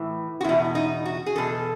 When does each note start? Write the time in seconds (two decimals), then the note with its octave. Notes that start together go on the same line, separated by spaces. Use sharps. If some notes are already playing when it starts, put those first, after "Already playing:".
Already playing: A2 E3
0.41 F#4
0.44 E2 B2 E4
0.75 D#4
1.05 F#4
1.26 G#4
1.36 E2 B2 A4